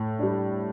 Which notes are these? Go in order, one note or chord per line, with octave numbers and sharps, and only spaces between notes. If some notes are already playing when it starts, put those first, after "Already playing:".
Already playing: A2
G3 D4